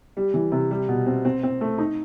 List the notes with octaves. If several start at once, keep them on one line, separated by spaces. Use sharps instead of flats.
G3
E3
C3
G3
B2
C4
C4
C4
A3
D#4